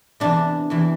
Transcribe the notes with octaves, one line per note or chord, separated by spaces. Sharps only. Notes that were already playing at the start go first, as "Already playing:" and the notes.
E2 C3 E3 D4
E2 C3 E3